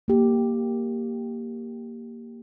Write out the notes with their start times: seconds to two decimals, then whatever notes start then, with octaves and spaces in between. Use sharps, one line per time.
0.08 A#3 G4